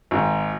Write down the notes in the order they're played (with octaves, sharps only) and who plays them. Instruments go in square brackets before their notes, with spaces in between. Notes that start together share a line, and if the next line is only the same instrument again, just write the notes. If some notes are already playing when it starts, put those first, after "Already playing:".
[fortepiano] G#1